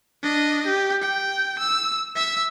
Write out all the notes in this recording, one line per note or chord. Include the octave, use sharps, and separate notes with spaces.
D4 D#5
G4
G5
E6
E5 E6